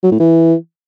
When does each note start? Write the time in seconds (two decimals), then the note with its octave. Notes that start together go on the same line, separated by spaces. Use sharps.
0.03 F#3
0.12 A2
0.20 E3